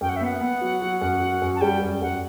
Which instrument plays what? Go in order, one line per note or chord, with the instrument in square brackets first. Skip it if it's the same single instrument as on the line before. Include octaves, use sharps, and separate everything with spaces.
[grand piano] F#2 [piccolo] G5
[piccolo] F#5
E5
[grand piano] B3 [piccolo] F#5
[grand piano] B3
F#3
F#3
F#2
F#3
F#2
[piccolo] A5
[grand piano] G3 [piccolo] G5
[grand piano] F#2
[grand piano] F#2 [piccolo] F#5